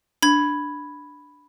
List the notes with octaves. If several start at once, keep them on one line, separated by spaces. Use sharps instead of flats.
D4 B5 G#6